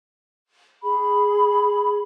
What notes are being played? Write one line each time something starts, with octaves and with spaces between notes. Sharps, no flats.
G#4 B5